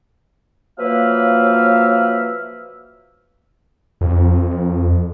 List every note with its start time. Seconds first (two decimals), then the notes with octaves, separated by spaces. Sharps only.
0.78 F3 F#3 A#3 B4 E5 F5
4.01 F2